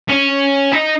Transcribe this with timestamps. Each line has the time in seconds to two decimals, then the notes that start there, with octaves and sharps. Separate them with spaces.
0.09 C#4
0.72 D#4